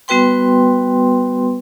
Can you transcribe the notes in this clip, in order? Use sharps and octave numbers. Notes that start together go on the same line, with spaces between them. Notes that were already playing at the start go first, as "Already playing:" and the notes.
G3 B3 F#4 B4 G5 C6